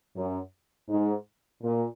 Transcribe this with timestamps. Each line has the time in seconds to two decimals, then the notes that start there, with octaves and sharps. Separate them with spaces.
0.16 F#2
0.89 G#2
1.62 A#2